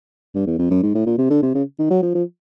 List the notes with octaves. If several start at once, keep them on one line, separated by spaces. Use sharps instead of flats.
G2
E2
F2
F#2
G#2
A2
A#2
C3
D3
C3
C#3
D#3
F#3
F3
F3